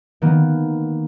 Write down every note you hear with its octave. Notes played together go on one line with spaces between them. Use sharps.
D#3 A#3 B3